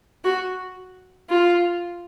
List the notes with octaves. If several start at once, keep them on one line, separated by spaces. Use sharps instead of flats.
F#4
F4